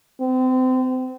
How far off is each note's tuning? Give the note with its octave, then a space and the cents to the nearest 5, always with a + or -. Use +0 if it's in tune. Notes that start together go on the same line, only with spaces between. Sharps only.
C4 -30